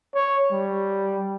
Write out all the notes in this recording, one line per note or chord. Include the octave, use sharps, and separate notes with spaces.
C#5
G3